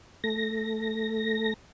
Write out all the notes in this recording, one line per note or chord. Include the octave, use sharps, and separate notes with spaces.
A3 A#6